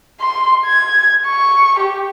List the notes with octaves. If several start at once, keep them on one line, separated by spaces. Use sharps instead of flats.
C6
G#6
C#6
G4